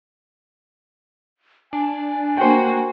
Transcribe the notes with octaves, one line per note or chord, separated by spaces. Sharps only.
D4 G#5
A#3 F#4 C5 G5